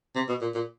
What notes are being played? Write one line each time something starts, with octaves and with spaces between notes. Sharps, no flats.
C3
B2
A#2
A#2